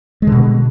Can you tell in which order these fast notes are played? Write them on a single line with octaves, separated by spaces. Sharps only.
G#3 D3 B2